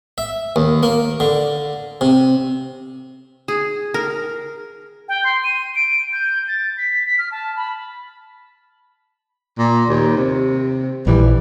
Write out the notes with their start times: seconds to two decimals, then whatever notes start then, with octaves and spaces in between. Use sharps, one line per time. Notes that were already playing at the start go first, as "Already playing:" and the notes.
0.18 E5
0.56 D#2
0.83 A#3
1.20 D3
2.01 C3
3.48 G#4
3.94 A#4
5.09 G5
5.24 C6
5.44 D#7
5.76 D7
6.13 G6
6.48 A6
6.78 B6
7.06 B6
7.19 F6
7.32 A5
7.57 B5
9.59 A#2
9.89 D#2
10.17 C3
11.07 A#1 E3 G3